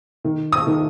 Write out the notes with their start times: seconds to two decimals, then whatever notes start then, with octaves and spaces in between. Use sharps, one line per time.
0.24 D#3
0.52 D#6
0.67 D#3